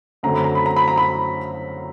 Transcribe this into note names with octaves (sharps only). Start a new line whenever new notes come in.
F#2 D3 F#3 A3 C4 A#5
B5
A#5
B5
A#5
B5
A#5
B5